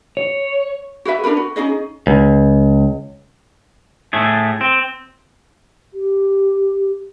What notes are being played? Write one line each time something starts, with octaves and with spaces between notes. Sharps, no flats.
C#5
F#4 G#4 B4 E5
D4 G4 A#4 B4
F#4
C#4 D#4 G#4 D#5
C#2
A2 A3 G#4
C4
G4